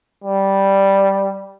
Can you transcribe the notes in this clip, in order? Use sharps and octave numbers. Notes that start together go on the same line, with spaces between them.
G3